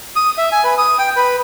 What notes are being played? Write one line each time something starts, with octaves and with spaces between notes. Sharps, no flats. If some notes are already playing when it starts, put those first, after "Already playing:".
D#6
E5
G#5
B4
D#6
G5
B4